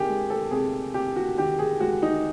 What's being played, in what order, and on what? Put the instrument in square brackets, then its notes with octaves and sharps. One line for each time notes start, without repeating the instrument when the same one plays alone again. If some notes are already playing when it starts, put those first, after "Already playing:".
Already playing: [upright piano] C3 D#3 G4 G#4
G#3
A4
C3 G#4
C3 G4
F#4
D#3 G4
G#4
G#3 F#4
D#4